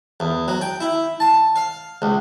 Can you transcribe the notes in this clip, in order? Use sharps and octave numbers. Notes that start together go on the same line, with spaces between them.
E2
F#3
G5
E4
A5
F5
C#2